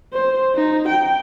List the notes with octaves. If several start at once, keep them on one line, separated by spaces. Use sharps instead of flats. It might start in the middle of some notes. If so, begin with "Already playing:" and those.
C5
D#4
G5